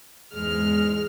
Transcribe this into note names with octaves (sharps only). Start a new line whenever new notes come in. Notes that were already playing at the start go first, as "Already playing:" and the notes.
E2 G#2 G#3 F6